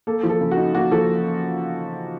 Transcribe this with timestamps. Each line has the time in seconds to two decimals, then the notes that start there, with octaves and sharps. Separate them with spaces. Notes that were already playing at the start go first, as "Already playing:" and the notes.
0.07 A#3 A4
0.23 F3
0.29 A4
0.41 C#3
0.51 F#4
0.57 D#4
0.75 A#3 F#4
0.91 F3 A4